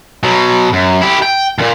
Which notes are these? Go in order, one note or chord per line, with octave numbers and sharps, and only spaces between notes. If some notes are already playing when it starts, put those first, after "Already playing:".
B2 F#3
F#2
E4 G4
G5
D#2 A#2